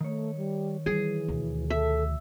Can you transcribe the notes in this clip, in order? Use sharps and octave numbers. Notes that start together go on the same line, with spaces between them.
D#3 A3 C#5
G3
E3 G3 G#4
D2 B2
A4 E5